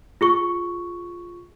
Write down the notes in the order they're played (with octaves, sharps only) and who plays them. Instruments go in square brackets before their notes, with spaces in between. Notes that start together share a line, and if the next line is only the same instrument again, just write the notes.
[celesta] F4 G#4 C#6